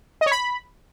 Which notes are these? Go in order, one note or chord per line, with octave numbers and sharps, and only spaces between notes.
D#5
C#5
B5